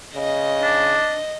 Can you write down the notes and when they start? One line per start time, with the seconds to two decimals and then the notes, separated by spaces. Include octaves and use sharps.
0.15 C#3 D#5
0.62 D4